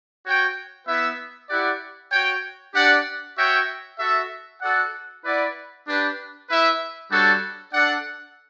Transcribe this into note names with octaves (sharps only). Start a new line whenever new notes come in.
F#4 C#5 G5
B3 E4 B4 E5
E4 G4 D5 F#5
F#4 C#5 G5
D4 G4 D5 F#5
F#4 C#5 E5 G5
F#4 A4 E5
F#4 A4 D5 F#5
E4 B4 D5 F#5
D4 G4 B4
E4 B4 E5
G3 D4 F#4 A4 C#5
D4 A4 D5 F#5